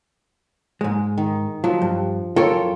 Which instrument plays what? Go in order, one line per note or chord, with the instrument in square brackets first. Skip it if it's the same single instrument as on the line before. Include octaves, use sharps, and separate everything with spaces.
[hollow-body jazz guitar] G#2 G#3
[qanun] D#3
[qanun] F3 [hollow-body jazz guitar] F#3
[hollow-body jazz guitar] G2
[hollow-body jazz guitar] F#2 A#4 C#5 [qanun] F4 A4 G5